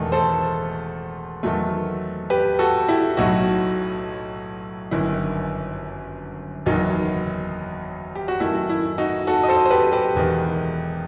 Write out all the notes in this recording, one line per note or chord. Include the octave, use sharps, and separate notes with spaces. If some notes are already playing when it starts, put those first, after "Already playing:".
Already playing: E1 E2 D#3 A3
A4 C5
E2 D#3 F#3 A3
G4 B4
F#4 A4
E4 G4
B1 A2 F#3 A3 D#4 F#4
G1 F#2 D#3 E4
F#1 E2 D#3 F#3 D#4
G4
F#4
F#2 D#3 A3 E4
E4
D#4 F#4
F#4 A4
D#5
A4 C5
C5
G4 B4
G4 B4
E1 E2 D#3